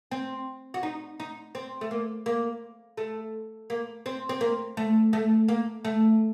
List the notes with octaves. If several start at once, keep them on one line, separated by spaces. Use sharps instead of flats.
C4
F#4
D#4
D#4
C4
A3
A#3
A#3
A3
A#3
C4
C4
A#3
A3
A3
A#3
A3